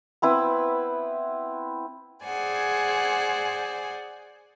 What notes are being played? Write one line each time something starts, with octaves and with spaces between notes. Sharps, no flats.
B3 C4 E4 B4
G#4 C5 D5 F#5 G#5